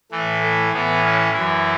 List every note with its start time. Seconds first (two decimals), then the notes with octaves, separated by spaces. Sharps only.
0.12 A2 E3 A3
0.43 A3
0.73 A2 E3 B3
1.03 C#4
1.33 F#2 E3 E4